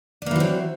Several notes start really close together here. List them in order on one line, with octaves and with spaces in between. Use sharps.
D4 A#3 E3 F#3 C4